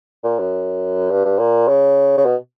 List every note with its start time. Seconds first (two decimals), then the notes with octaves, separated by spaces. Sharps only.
0.24 A#2
0.39 F#2
1.10 G2
1.25 G2
1.39 A#2
1.68 C#3
2.17 C#3
2.25 B2